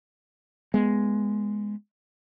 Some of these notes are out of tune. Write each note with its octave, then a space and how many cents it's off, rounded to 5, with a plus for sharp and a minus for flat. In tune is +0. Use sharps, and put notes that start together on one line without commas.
G#3 +0 B3 +0